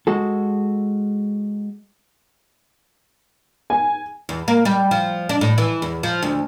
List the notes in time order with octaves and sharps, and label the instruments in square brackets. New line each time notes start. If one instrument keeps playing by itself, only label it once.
[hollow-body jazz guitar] G#3 F#4 A4
[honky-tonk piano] G#5
[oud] E2
A#3
G3
F3
D4
A2
E3
E2
F3
D2